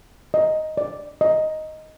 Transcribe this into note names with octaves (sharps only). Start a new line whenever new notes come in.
D#5
D5
D#5